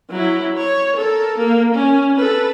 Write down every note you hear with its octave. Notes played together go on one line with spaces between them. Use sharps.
F#3 E4
C#5
A4 A#4
A#3
C#4
A4 B4